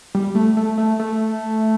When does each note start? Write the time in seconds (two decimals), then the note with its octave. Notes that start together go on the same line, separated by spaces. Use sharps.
0.15 G3
0.35 A3
0.57 A3
0.78 A3
0.99 A3